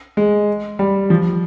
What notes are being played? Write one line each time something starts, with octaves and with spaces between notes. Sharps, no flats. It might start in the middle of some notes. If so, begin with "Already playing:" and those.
G#3
G3
F3